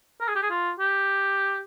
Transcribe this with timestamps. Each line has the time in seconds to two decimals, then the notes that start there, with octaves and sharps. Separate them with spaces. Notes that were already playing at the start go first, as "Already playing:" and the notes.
0.21 A#4
0.28 G#4
0.35 G4
0.42 G#4
0.50 F4
0.80 G4